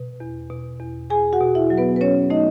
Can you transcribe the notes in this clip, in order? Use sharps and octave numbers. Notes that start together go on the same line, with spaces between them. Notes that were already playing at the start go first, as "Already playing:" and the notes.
Already playing: B2
E2
B2
E2
E2 G#4 G#5
F#4 F#5
B2
E4 E5
F#3
B3 B4
B4
F#3 C#4 C#5
A3 D#4 D#5